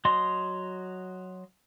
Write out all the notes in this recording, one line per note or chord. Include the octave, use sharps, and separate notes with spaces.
F#3 D#5 C6